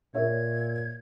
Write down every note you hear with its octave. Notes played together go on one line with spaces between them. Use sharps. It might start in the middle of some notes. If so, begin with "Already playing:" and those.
A#2 A#4 C#5 E5 G#6